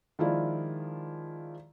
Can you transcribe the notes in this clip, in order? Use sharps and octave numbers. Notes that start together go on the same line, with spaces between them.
D#3 F3 G#3 E4 F4 D5